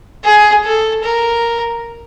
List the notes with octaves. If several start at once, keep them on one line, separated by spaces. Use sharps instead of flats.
G#4
A4
A#4